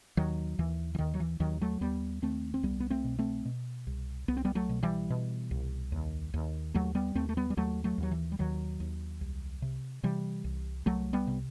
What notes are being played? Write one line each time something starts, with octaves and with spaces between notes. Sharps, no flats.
D#2 D#3 F#3
D#2 E3
E3
D#2 D#3
F#3
E3
D#2 D#3 F#3
F#3 A3
D#2 G3 B3
D#2 A3 C4
C4
C2 G3 B3
B3
A3 C4
B2
A3 C4
B2
C2
C2 B3
C4
G3 B3
F#3 A3
B2
E3 G3
B2
C2
D#2
D#2
D#2 F#3 A3
G3 B3
D#2 A3 C4
A3
G3 B3
G3
D#2 F#3 A3
F#3 A3
D#2 F#3
E3
G3
D#2 D#3 F#3
D#2
C2
C3
C3 E3 G3
C2
C2 F#3 A3
G3 B3
C3